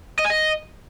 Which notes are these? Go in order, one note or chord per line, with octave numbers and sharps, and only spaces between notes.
D#5
G#5
D#5